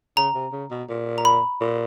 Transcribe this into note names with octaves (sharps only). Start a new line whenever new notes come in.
C#3 A#5
C3
C#3
B2
A#2
A#5
B5
A#2